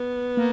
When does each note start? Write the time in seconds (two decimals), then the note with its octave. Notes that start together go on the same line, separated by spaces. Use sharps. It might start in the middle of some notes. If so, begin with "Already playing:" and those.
Already playing: B3
0.37 A#3